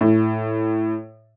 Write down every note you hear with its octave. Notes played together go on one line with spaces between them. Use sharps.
A2